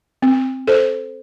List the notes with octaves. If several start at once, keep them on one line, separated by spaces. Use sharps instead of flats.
C4
A4 C5